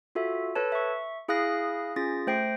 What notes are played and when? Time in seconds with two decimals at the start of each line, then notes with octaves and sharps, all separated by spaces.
0.15 F4 F#4 A4 E5
0.55 A4 B4 C#5 A5
0.72 E5 C#6
1.28 E4 G#4 F5 D#6 F#6 A#6
1.96 C#4 F4 G#4 A6 A#6
2.27 A3 C5 G5 A#6 C7